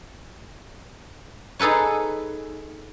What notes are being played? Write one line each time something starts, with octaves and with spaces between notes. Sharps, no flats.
D#4 G#4 A4 B4 C#5